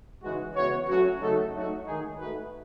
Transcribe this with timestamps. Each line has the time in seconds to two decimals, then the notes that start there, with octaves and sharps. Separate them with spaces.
0.22 C#3 E3 G#3 D#4 F#4
0.55 C#3 E3 B3 F#4 C#5
0.88 F#3 A3 C#4 F#4
1.20 C#3 F#3 A3 D#4 A4
1.53 F#3 A3 D#4 F#4
1.86 D#3 G#3 D#4 G#4
2.18 A3 D#4 F#4 B4